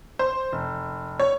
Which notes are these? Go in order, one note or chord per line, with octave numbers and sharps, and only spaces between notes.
C5
F1
C#5